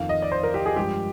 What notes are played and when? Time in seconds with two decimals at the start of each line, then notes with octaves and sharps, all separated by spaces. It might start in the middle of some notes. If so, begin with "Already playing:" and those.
Already playing: F2 D#3 A#3 F5
0.09 D#5
0.22 D5
0.32 C5
0.43 A#4
0.54 G4
0.66 G#4
0.76 G2 F3 G#3 G4